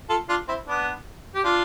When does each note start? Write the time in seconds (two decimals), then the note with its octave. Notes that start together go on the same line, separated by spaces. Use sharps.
0.09 F4 A4
0.29 D4 F4
0.48 C4 E4
0.67 B3 D4
1.35 G4
1.44 D4 F4